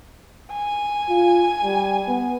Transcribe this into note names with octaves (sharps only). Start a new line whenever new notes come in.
G#5
F4
G3
B3